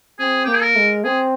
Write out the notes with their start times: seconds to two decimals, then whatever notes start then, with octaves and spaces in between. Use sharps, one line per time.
0.19 C4 G#4
0.45 A#3 G4
0.53 G#4
0.62 A#4
0.76 G#3
1.04 C4 G#4